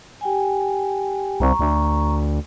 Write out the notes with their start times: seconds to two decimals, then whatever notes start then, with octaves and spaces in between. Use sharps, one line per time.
0.21 G4 G5 G#5
1.40 C2 A#5 C#6
1.59 D2